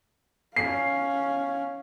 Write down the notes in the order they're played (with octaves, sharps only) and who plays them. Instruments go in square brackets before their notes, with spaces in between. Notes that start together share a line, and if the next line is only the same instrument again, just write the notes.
[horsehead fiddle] C#4 F5 [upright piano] C7